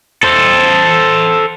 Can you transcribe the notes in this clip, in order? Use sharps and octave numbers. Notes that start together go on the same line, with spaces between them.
A4 C5